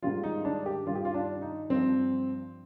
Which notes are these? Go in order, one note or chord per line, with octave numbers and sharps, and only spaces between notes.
G#2 D#3 G3 F4
D#4
D4
G4
G2 D#3 G3 F4
G4
F4
D4
D#4
G2 F3 C4